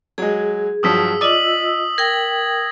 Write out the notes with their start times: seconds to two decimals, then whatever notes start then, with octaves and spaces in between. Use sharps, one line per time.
0.18 F#3 G#3 G#4
0.83 G2 F3 F#3 D#6 E6 B6
1.21 F4 D5 D#5 D#6 E6 F#7
1.98 A#4 G5 G#6 A#6